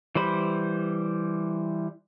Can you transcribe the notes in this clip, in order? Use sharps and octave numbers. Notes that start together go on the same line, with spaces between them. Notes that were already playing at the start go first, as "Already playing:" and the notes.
E3 G3 C5 B5